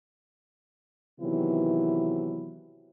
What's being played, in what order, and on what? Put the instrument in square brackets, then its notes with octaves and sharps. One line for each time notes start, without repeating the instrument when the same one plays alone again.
[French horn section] C3 D#3 E3 F#3 B3 E4